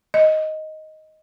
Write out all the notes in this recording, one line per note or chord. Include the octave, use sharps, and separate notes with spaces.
D#5